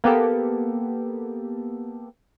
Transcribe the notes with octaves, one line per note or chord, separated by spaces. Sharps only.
A#3 B3 G4 A4